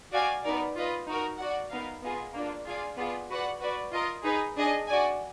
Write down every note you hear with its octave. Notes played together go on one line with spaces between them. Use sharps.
F#4 D5 F5 G#5
B3 D#4 A#4 D5
F4 B4 D#5
D#4 F#4 A#4
F#4 D5 F#5
B3 D#4 A#4 F5
B3 F4 G#4 D#5
A#3 D4 F4
F4 G#4 D5 F5 G#5
B3 F4 G#4 D5
F#4 B4 D5 F#5
F#4 B4 D5
F4 A#4 D#5
D#4 G#4 B4
D4 G#4 D#5 G#5
F#4 D5 G#5